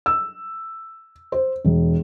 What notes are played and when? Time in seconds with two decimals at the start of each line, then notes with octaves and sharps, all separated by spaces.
0.06 E6
1.32 C5
1.65 E1